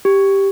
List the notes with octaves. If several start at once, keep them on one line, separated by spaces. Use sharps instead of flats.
G4